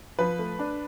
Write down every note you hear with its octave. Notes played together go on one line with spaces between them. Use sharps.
F3 B4
A3
D4